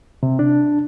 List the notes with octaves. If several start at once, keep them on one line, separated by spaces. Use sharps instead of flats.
C3
D4